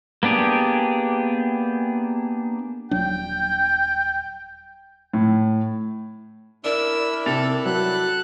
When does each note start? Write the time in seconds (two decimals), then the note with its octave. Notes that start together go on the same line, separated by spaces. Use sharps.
0.23 A#3 B3 D4 G4 G#4
2.91 D#1 F#3 D4 G5
5.13 A2
6.64 D4 E4 A#4 D5 B5 E6
7.26 C3 A4 A6 F7
7.66 F#3 A4 F#6